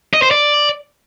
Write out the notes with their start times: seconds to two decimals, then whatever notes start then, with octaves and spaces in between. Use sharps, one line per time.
0.14 D#5
0.22 C5
0.31 D5